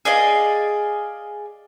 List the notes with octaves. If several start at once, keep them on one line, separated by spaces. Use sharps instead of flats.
G#4 D5 D#5 F5